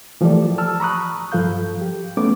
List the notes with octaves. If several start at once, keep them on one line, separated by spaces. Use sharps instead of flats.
E3 F3 A3 G4 A4 D5
A5 E6 F6
A#5 B5 C#6 D#6 F#6
G2 F3 A4 F5 G6
G4
A3 B3 C#4 D6